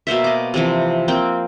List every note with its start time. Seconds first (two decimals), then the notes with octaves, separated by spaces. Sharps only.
0.07 B2 A#3 C5 E5
0.24 D#5 D6
0.54 C3 E3 F3
1.08 A#3 C4 G5